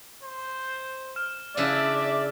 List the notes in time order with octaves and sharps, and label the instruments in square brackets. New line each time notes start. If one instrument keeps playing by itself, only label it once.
[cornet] C5
[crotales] F6 E7
[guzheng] C#3 D4 E4 [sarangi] D5 [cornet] E5